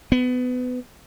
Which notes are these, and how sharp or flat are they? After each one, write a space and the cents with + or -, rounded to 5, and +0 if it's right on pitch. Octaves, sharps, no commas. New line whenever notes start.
B3 +25